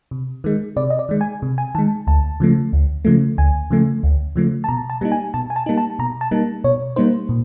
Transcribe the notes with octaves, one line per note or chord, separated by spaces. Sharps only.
C3
D#3 G#3
C3 D5
D#5
D5
D#3 G#3
G#5
C3
G#5
D#3 G#3 A5
D2 A5
C#3 F3 A3
D2
C#3 F3 A3
D2 G#5
C#3 F3 A3
D2
C#3 F3 A3
A5
B2 A#5
A5
G3 A#3 D#4
G#5
B2 A5
G#5
A5
G3 A#3 D#4
A5
B2 A#5
A5
G3 A#3 D#4
B2 C#5
G3 A#3 D#4 C5
A#2